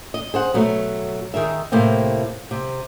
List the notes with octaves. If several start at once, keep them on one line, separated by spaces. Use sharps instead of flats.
D#5
G#4 C5 F#5
B2 F#3 A3
D#3 G#4 A#4 E5
A2 C3 A#3 C4
C3